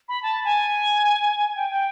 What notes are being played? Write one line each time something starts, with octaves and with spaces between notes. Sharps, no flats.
B5
A5
G#5
G5
G5